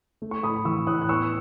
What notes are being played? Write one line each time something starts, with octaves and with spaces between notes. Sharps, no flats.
A3
C#6
A2 B5 D#6
E3 C#6 E6
A2 D#6 F#6
F#6
B3 C#6 E6